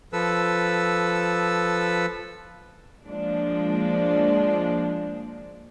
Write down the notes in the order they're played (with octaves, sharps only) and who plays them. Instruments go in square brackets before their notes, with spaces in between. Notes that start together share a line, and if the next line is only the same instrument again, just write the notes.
[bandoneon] F3 A4 B4 E6
[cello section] F3 G#3 A#3 D4